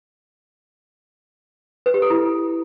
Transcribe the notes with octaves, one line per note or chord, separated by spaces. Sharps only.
B4
G4
A4
E4